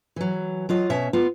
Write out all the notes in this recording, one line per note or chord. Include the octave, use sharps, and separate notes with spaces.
E3 F#3
F#3 F4 D#5
B2 C#4 E5
B3 F4